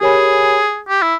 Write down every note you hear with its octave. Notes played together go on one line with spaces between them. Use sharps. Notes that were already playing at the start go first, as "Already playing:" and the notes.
G4 G#4 A#4 C#5 G#5 B5
G4
E4